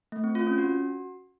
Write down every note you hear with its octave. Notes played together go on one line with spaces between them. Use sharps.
A3
C4
F4
C#4
F#4